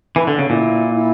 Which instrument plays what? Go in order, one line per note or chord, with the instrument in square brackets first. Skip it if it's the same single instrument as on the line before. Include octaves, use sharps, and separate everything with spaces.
[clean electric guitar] E3
D3
C#3
[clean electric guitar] A#2 [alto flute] E4
[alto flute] E4